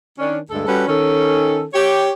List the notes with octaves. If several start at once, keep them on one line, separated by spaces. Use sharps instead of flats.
D#3 C#4 D4
D2 G2 G#3 A4
G3 C#4 F#4 A4 B4 C#5
D#3 C#4 A4
G4 C#5